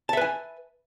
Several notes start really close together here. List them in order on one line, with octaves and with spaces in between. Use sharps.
A5 E5 B4 G#5